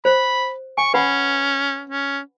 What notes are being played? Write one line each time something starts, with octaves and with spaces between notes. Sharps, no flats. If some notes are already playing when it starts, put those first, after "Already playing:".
C5 B5
G#5 C#6
C#4 B4 F#5 B5
C#4